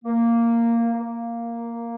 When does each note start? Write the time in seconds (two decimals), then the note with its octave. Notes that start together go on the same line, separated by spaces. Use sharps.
0.04 A#3
0.94 A#3